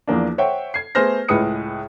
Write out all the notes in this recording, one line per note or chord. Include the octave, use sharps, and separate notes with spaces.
E2 F3 A#3 D4
C5 C#5 E5 F#5 G5
G#6 C7
A3 B3 G#4 C5 F6 A#6
C#2 A2 G#3 B4 D#6 C#7